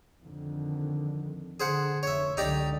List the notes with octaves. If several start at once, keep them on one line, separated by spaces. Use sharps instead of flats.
F2 D3 D#3
D3 G#4 C5 F#5
F1 C#5 E5
C#2 D3 F#3 D#4 G4 D5